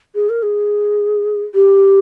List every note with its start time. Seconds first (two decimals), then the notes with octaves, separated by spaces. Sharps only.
0.15 G#4
0.29 A#4
0.43 G#4
1.54 G4